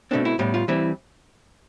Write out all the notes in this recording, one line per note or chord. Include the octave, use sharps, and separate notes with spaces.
B2 A3 C4 D4
E4
A2 G3 B3
F4
E3 G3 C4 E4